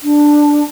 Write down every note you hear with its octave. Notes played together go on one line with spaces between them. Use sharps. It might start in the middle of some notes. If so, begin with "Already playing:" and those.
D4